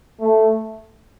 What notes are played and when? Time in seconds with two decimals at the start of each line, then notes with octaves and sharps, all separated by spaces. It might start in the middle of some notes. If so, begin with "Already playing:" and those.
0.20 A3